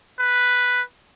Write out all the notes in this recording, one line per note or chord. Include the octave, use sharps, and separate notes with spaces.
B4